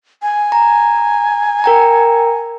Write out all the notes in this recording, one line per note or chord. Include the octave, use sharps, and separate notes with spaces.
G#5
A#5
A#4 G5 A#5